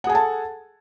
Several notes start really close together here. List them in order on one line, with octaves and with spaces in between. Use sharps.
F#5 G#4 G#5 A4 A5